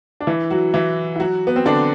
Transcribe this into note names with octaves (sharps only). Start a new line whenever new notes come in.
D4
E3 E4
F#3 F#4
E3 E4
E4
F#3 F#4
B3
C4
D3 D4